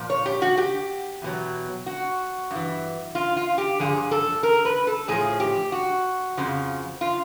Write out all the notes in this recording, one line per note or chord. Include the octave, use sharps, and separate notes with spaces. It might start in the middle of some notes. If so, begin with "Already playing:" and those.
Already playing: A#2 F3
C#5
G4
F#4
G4
E2 B2 F#3
F#4
G2 E3
F4
F4
G4
G2 D3 F3 G#4
A4
A#4
B4
A4
A2 F3 G#4
G4
F#4
F2 C#3 F3
F4